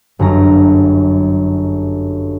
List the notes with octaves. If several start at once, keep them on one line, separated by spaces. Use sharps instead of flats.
G1 F#2 F#3 A#5